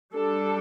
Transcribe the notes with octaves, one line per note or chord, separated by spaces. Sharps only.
G3 D4 A4